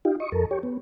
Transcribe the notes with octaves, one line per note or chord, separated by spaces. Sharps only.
D#4 F4 G4
D#5 C#6
F2 A4 A#4
G4 C#5
B3